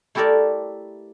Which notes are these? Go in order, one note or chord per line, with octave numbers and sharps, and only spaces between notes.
A3 E4 G4 A4 A#4 D5